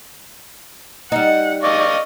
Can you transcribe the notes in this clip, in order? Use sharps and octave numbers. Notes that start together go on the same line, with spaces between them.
G3 D#4 F#5
D5 D#5 F5 C#6